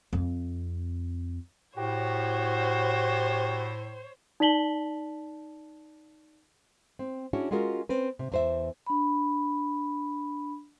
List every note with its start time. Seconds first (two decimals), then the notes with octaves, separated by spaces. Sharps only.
0.13 F2 C4
1.77 A2 F#4 G4 C5 C#5
4.40 D#4 D5 A5 B6 F#7 G7
6.99 C4
7.33 C#4 D4 E4 F#4 G#4 C#5
7.51 G#3 C#4 F4 F#4 G#4 A#4
7.89 C4 C#4 B4
8.19 C3
8.32 E2 E3 C5 D5 E5
8.86 D4 B5